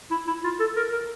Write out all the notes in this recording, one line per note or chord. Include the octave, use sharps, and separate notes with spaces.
E4
E4
F4
A4
A#4
A#4